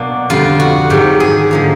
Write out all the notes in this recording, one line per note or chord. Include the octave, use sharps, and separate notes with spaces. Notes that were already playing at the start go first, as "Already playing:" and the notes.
Already playing: B2 F#3 A#3 D4
F2 D3 G3 B3 F4
F#4
G#2 D#3 F#3 G4
G#4
D3 F3 A#3